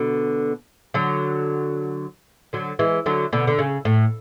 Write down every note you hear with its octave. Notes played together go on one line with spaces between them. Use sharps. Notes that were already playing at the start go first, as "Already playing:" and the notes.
Already playing: B2 D3
D3 F#3
D3 F#3
E3 G#3
D3 F#3
B2 D3
D3
C#3
A2